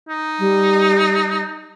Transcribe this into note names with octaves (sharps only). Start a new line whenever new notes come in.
D#4
G3